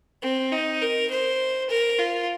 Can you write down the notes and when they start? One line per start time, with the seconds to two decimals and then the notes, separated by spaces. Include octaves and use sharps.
0.22 C4
0.52 D#4
0.81 A#4
1.10 C5
1.69 A#4
1.98 F4